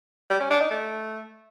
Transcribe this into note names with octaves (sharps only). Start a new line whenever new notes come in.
G3
C#4
D4
D#4
A3